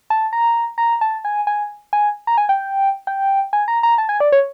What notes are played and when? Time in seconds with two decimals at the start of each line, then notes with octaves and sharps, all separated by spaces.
0.10 A5
0.33 A#5
0.78 A#5
1.01 A5
1.25 G#5
1.47 G#5
1.93 G#5
2.27 A#5
2.38 G#5
2.49 G5
3.07 G5
3.53 G#5
3.68 A#5
3.83 A#5
3.98 A5
4.09 G#5
4.20 D5
4.32 C#5